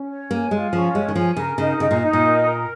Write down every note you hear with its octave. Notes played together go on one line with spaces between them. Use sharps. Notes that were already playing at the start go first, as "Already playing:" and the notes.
Already playing: C#4
C#5
A#3 G#5
G#3 F4
F3 C#4
G#3 C#5
D#3
F3 G#5
C#3 A#4
C#3 D#4
C#3 D#5
A#2
D#4
A#2
A#4
A#4